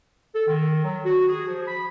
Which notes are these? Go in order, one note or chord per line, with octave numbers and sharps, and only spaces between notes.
A4
D#3
F#3
F#4
G#4
F3
B5